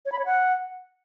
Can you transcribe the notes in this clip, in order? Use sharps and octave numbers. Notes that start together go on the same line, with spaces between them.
C#5
B5
C#5
F#5